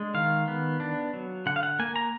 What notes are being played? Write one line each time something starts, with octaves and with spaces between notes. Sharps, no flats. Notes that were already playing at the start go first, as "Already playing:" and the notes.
Already playing: G#3 D4
D#3 F5
B3
D4
F#3
D3 F#5
F5
F#5
A#3 G#5
A#5